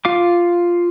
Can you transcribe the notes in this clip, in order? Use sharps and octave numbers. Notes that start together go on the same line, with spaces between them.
F4 F5 D6